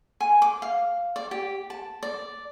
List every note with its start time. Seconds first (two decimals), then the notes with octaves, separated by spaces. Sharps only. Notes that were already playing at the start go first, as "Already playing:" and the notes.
0.21 G#5
0.42 D6
0.62 F5
1.16 D5
1.31 G4
1.70 A5
2.03 D5